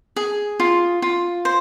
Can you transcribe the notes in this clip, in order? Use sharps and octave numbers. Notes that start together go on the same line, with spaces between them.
G#4
F4
F4
C5